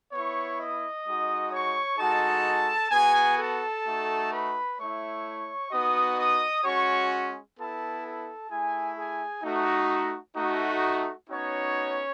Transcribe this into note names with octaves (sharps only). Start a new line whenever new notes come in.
B3 E4 C#5 C#6
D#5 D#6
G#3 D#4 F#4
C#5 C#6
G#3 D#4 F#4 A4 A5
B3 F#4 G#4 G#5
A4 A5
A3 D#4 F#4
B4 B5
A3 E4 C#5 C#6
B3 D#4 F#4 D#5 D#6
D#5 D#6
G#3 C#4 F#4 C#5 C#6
B3 E4 A4 A5
A4 A5
A3 E4 G#4 G#5
G#4 G#5
A3 D#4 F#4
A3 D#4 F#4
B3 C#4 D#4 F#4 C#5